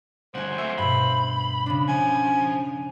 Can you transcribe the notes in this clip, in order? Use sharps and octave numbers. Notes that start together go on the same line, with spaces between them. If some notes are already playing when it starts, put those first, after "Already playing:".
D2 G2 C5 F#5 G#5
F#3 A3 E5
G2 B2 B5
C#3 D4
F3 G#5